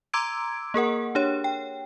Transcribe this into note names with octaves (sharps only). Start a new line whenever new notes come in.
A#5 C6 D6 E6 G#6 D7
A#3 G#4 A#4 F#5
D4 G4 C#5
G5